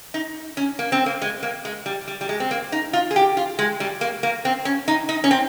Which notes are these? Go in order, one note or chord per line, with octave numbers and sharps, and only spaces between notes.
D#4
C#4
A#3
C4
A#3
G#3
A#3
G#3
G3
G3
G3
G#3
C4
A#3
D#4
F4
G#4
G4
F4
G#3
G3
A#3
A#3
C4
C#4
D#4
D#4
C#4
C4